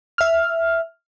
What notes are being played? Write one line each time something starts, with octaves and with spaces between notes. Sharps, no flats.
E5 F6